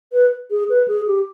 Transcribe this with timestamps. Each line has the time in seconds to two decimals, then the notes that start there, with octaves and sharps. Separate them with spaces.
0.13 B4
0.51 G#4
0.70 B4
0.88 G#4
1.07 G4